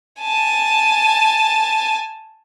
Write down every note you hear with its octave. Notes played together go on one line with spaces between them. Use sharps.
G#5 A5